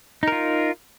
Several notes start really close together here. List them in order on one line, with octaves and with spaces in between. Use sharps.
D#4 A#4 F4